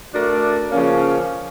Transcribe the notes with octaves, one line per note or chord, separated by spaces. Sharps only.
A3 D4 F#4 A#4 D5
C#3 F3 A#3 C#4